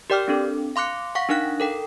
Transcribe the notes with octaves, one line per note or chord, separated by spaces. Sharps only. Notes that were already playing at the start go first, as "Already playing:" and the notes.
G4 A#4 D5 G5 D6 F6
C4 D4 A4
F5 C6 D6 F#6 C#7
F5 F#5 C#6 B6
D4 D#4 A#4 F5 F#6
A4 A#4 G5